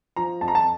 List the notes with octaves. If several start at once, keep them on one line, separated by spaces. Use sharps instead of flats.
F3 A#5
F2 A5
A#5
A5